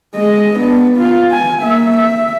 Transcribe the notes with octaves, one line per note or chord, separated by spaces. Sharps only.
G#3 D#5
B3 D4
B3 F4
G#5
A#3 E5
E5